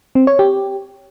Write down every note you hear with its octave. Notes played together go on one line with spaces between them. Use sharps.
C4
C#5
G4